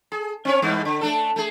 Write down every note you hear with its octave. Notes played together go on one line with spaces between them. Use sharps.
G#4
C4 C#4 C#5
E2 G2 B3
D3
A3 D4 A4
A3 G#4